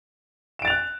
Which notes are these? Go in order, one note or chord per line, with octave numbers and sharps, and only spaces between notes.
F#6 A6 D7 E7 F7